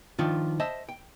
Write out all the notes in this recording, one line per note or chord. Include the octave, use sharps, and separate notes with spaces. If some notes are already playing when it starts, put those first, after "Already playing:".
D#3 F3 D4 F4
C5 D#5 E5 A5
G5